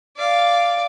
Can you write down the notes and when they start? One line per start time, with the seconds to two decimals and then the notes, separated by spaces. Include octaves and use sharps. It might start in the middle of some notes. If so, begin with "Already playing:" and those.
0.17 D5 F5